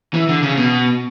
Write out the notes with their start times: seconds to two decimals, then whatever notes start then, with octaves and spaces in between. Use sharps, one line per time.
0.14 E3
0.29 D3
0.43 C#3
0.57 B2